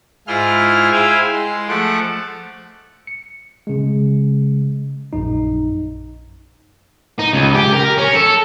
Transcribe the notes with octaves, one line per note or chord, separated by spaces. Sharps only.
G#2 E4 F4 G#4 C6 F6
E4 G#4 C5 F5 G5 G#5
G#3 C6
F3 A3 F#5 D6
C#7
C#3 G#3
A#1 F#2 D#4
D#4
C#2
G4
A#4
C#4
A4